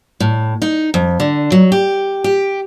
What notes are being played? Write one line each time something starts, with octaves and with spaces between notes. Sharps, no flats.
A2
D#4
F2
D3
F#3
G4
G4